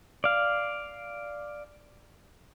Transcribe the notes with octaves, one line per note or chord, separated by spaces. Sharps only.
D5 F5